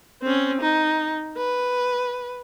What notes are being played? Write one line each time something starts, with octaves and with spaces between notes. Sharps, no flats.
C4 C#4
D#4
B4